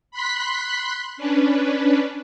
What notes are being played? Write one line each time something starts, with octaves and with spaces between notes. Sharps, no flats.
B5 C6 F#6 B6
C#4 D4 B4